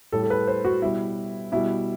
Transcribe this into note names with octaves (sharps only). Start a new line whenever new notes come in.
A2 G3 A4
A4
B4
C5
F#4
B2 G3 E4
B2 G3 E4